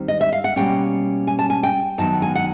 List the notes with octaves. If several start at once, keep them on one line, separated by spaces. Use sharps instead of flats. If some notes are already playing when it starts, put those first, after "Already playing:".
Already playing: D#2 D#3 G3 C4
D#5
E5
F5
F#5
B2 G3 A#3 C#4 G5
G#5
A5
G#5
G5
F#2 D#3 F#3 B3 A5
G#5
F#5